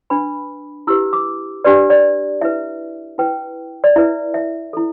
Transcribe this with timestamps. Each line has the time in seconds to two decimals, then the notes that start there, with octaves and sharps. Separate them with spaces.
0.10 D4 B4 B5
0.87 E4 G4 B4 E6
1.13 D6
1.64 D4 G4 B4 D5
1.90 D5
2.41 E4 B4 E5
3.18 E4 B4 G5
3.84 D5
3.96 E4 B4 E5
4.34 E5
4.73 E4 A4